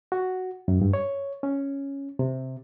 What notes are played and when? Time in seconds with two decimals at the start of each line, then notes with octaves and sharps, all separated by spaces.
0.12 F#4
0.68 F#2
0.82 G2
0.93 C#5
1.43 C#4
2.19 C3